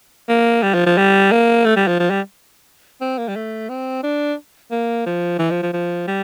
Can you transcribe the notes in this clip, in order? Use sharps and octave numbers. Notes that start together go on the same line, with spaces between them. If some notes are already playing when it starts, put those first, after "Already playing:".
A#3
G3
F3
F3
G3
A#3
A3
G3
F3
F3
G3
C4
A#3
G3
A3
C4
D4
A#3
F3
E3
F3
F3
F3
G3